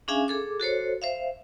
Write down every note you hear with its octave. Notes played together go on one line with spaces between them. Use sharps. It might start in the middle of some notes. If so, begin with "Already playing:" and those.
C#4 D4 G#4 E5 F5 G#5
G#4 A4 D6
F#4 A4 C5 C#5
C5 E5 F5